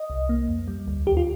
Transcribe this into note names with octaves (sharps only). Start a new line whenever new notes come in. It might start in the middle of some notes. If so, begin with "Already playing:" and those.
Already playing: D#5
C2
A#3
F2
G3
D2
D#2 G4
F4